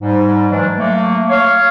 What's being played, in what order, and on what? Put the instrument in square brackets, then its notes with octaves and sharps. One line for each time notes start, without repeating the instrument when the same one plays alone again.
[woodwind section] G#2 G3
E3 F#3 G#3 D4
F#3 A3 A#3
C#5 F5